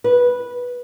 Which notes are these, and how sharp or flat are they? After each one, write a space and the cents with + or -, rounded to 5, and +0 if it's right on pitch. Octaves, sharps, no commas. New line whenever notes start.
B4 -10